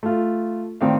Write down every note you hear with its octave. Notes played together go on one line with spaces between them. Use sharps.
A3 F4
A2 D#3 C4 D5 F5